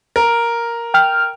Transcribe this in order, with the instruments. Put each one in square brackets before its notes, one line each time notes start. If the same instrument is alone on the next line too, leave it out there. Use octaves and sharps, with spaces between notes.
[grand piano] A#4
[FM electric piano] G5 F6